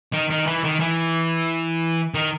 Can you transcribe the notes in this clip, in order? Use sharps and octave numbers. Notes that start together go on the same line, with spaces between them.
D#3
D#3
E3
D#3
E3
D#3